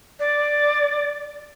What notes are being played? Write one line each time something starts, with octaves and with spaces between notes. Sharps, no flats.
D5